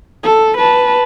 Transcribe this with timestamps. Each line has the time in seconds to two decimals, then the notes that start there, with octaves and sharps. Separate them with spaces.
0.23 A4
0.57 B4 A5